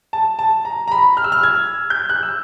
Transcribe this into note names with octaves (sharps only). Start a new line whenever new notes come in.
A5
A5
A#5
A#5
B5
F6
E6
F6
G#6
G6
F#6
E6